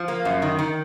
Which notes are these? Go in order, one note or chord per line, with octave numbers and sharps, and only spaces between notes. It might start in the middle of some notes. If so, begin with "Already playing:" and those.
Already playing: F3
A#3
F#2
D#3
D#3